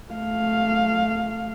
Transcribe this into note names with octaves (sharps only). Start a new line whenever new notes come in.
A3 F5